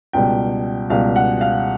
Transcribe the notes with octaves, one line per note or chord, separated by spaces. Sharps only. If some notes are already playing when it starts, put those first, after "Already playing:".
C#2 B2 G3 G5
C#2 B2 G3 F5
F#5
F5